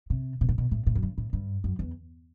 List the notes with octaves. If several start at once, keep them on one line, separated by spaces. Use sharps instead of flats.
C3
B2
A2
B2
A2
A2
F#2
G2
A2
G2
F#2
E2